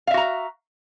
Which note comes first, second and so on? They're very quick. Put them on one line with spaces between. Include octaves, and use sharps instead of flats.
F5 E5 F#4 A#5